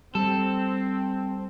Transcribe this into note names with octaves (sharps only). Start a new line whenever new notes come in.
G3 C4 A4